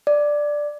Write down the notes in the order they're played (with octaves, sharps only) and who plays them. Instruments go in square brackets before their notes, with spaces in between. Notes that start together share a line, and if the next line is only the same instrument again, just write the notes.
[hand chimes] D5